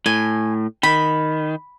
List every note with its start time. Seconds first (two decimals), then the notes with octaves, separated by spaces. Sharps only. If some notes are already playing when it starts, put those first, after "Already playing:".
0.06 A2 G#5
0.83 D#3 B5